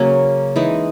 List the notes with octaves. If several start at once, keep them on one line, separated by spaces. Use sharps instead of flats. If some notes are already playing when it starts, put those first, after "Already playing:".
Already playing: C#3 F#3 A#3 C#4
E3 G#3 D#4